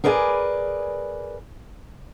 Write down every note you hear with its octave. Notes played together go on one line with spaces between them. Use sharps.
G#4 A#4 B4 D5 F5 G#5